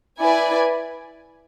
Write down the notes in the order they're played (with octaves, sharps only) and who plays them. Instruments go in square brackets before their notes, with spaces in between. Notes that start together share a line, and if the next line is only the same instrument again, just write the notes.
[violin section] E4 B4 D5 G#5